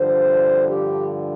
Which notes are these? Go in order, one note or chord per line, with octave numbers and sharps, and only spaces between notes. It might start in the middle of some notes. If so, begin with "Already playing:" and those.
Already playing: G2 D3 F3 C5
G4